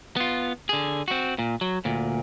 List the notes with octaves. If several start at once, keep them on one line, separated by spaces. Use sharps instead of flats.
B3 F4
D3 G#4
C4 F#4
A#2
F#3
D2 A#2